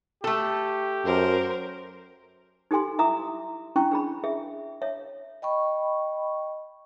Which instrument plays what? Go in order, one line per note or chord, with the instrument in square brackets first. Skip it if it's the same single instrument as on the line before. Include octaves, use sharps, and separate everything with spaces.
[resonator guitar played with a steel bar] A3 A4 [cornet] G4
[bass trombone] F#2 [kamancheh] A#4 C5
[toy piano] D#4 G4 A4 G#5 C6
E4 E5 A#5 D6 D#6
C#4 D4 E4 G5 C#6
D4 G#4 B5
G#4 E5
C#5 E5
[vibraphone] D#5 G5 B5 C#6